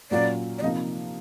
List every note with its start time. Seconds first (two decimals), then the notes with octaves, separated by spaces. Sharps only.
0.11 A#2 F#3 A#3 C#4 F4 D5
0.58 D5
0.62 C3 F3 A#3 D#4 D#5